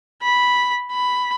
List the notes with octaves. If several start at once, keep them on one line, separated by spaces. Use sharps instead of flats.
B5
B5